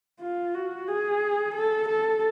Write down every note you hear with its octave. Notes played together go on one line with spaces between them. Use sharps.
F4
F#4
G#4
A4
A4